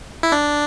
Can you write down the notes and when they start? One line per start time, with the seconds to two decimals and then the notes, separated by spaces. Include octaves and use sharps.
0.23 E4
0.32 D4